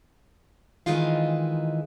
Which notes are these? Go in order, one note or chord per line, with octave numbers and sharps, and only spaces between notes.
D#3 E3 G#3 D#4 F4 F5